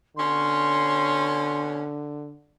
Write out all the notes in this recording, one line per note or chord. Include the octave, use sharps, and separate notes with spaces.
B2 D3 C#4 C6